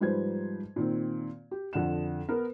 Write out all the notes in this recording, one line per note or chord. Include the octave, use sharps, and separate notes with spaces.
G#2 F3 G3 B4 C5 G#6
A#2 D#3 C4
G4
F2 D3 F#5 E7
B3 A#4